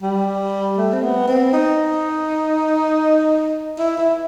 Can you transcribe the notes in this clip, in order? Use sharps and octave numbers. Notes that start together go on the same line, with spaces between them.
G3
A3
C4
B3
C4
D#4
E4
E4